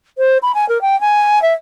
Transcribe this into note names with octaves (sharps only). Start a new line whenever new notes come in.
C5
B5
G#5
A#4
G5
G#5
E5